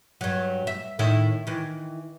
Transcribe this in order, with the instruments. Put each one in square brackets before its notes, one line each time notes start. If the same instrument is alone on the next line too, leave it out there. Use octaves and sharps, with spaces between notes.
[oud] G2 F#3
E5
A2 D#3 E4
D#3 E3